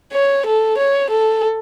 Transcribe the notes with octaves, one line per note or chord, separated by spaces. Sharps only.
C#5
A4
C#5
A4